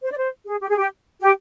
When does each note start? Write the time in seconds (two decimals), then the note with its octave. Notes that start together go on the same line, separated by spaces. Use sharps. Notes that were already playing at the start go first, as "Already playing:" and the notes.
0.02 C5
0.12 D5
0.18 C5
0.46 G#4
0.61 G4
0.69 G#4
0.77 G4
1.19 G4